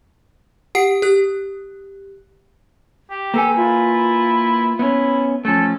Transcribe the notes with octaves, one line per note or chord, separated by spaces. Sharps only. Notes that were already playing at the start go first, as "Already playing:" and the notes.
G4 F#5 C7
G4 F#6
G4
A#3 A4 B4 G#5
E4 F4
B3 C#4 E4
F3 A3 C#4 A4